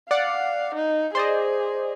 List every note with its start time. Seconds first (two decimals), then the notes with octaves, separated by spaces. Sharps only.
0.11 D5 F5 F#5
0.75 D#4
1.15 G#4 C5 D5 D#5